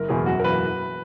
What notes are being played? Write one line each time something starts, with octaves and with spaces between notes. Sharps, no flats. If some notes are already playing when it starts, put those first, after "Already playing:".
Already playing: F#1 A#4
E2 B2 G#3 G#4
F#2 F#4
A#4
E3 A#3 B4